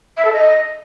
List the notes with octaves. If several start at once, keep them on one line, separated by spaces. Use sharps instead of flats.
E5
A4
D#5